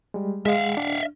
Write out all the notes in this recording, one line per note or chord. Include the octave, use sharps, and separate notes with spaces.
G3 G#3
G#3 G#4 E5 F5
D4